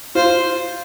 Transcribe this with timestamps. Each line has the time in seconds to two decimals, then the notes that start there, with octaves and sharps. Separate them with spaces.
0.15 F4 C5